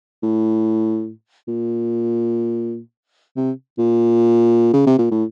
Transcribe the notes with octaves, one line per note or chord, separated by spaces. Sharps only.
A2
A#2
C3
A#2
C#3
C3
A#2
A2